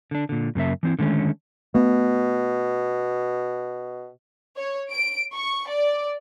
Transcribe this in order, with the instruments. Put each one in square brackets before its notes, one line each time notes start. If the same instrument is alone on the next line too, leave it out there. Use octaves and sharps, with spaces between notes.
[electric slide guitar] D3 D4
A#2 D3
F#2 C#3 A#3 E5
E3 C4 E4
D3 D#3 G#3 A3 C#4
[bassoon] B2 [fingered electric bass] A3 B3
[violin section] C#5
D7
C#6
D5